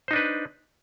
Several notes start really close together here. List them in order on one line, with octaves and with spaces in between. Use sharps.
C5 D#4 D4 B4